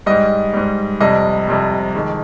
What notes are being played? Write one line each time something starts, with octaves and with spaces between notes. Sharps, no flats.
G#2 G3 D#5
G#2 G3
F2 C3 G3 D#5
F2 C3 G3
F2 D#3 G#3